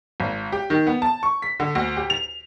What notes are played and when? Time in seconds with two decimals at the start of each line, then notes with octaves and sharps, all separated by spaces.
0.20 G#1
0.52 G4
0.70 D#3
0.87 B3
1.02 A5
1.23 C#6
1.42 B6
1.60 D3
1.75 D2
1.97 G4
2.10 F7